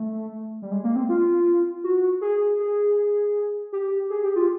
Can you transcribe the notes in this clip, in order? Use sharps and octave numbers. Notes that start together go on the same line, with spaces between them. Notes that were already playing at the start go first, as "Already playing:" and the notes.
Already playing: A3
G3
G#3
A#3
C4
F4
F#4
G#4
G#4
G4
G#4
G4
F4